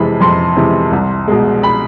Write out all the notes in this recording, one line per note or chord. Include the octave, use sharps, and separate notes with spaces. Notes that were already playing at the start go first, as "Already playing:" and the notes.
Already playing: F2 C3 E3 G#3 B5
F2 C6
C3 E3 G#3
C2
B2 G#3
B5